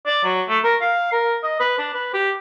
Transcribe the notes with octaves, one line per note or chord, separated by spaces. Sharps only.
D5
F#3
A3
A#4
F5
A#4
D#5
B4
D4
B4
G4